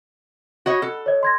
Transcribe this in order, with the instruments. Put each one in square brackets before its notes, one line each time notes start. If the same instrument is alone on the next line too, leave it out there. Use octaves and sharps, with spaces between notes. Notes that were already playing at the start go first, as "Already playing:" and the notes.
[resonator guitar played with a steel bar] F#4 C#5 D#5 [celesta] F#5
[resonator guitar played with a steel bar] A4
[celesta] C#5 D#5
C6 G#6 A#6